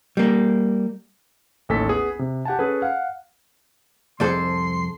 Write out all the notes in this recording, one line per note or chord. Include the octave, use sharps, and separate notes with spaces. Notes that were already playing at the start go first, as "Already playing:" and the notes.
G3 A#3
A1 D#2 A4 G#5 B6
B3 G#4
C3
G4 F#5 G#5 A5
C#4 G#4 A4 B4
F5 F#5
C2 F2 G#4 A4 C5 D5 C6